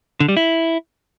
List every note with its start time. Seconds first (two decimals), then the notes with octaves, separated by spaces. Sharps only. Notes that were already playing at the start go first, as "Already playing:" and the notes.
0.20 D3
0.29 G3
0.37 E4